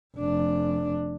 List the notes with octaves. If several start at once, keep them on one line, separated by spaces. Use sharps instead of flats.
F1 D4